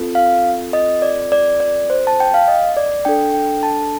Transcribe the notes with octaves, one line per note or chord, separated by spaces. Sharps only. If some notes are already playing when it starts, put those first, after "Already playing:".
Already playing: C4 F4 A4
F5
D#5
D5
D5
D5
C5
A5
G5
F5
D#5
D5
D4 A4 G5
G5
A5